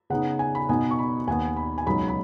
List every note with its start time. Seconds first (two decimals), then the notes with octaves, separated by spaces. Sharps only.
0.10 C#3 B3 D#4 F#5
0.39 G#5
0.55 B5
0.69 B2 B3 D#4 G#5
0.91 C#6
0.99 B5
1.27 D#2 D#3 B3 G#5
1.56 B5
1.78 G#5
1.86 C#2 B2 F#3 D#4 B5
2.08 B5